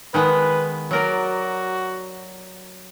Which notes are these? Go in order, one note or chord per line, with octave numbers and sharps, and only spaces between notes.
D#3 G#3 B3 B4
F#3 F#4 A#4 D5